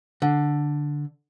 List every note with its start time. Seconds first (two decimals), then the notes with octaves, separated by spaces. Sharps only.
0.22 D3